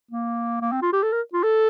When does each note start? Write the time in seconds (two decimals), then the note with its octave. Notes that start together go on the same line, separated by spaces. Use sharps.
0.11 A#3
0.61 A#3
0.72 C4
0.82 F4
0.93 G4
1.03 A4
1.12 A#4
1.33 F4
1.43 A4